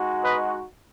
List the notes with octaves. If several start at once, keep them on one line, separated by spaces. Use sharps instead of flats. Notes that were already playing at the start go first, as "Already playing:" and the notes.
Already playing: G#3 D#4 F#4
B4 D#5